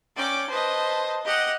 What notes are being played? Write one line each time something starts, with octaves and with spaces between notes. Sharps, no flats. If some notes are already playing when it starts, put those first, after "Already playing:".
C#4 D5 G5 D6
B4 C5 D#5 A5
G4 D#5 F#5